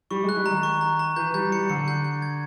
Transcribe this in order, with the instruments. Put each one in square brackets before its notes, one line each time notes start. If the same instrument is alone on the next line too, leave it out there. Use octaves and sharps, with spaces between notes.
[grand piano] G3 [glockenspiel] C#6
[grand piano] G#3 [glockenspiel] F#6
[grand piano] G3
[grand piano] D#3 [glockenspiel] A#5
[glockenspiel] C#6
A#5
A#5
[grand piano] E3 [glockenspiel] G6
[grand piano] G3 [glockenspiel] G6
[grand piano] G3 [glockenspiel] C#7
[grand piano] D3 [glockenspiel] C#7
[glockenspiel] G6
G6
G#6